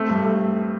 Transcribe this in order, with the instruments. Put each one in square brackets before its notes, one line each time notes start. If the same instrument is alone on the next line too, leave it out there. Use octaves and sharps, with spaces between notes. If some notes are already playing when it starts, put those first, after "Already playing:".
Already playing: [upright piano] A3 C4
G2
A3